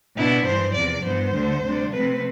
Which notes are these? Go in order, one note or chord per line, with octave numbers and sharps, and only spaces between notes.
B2 B3 D4 E4
G2 E3 G3 C5
E2 C3 F3 D5
G2 E3 B3 C5
D2 D3 G3
D2 C3 G3 D4
C3 F3 A3 C4 B4